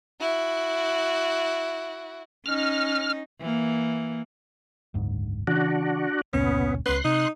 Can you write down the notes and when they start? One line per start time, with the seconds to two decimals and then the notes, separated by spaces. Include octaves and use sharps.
0.20 E4 F#4
2.46 C#4 D#4 F6
3.41 E3 A#3
4.94 F#1 D2 G#2
5.47 C#3 E3 C#4 D4 F#4
6.33 F1 C#2 A#2 B3 C#4
6.86 C#2 C#4 B4 C6 F#6
7.05 C3 D#4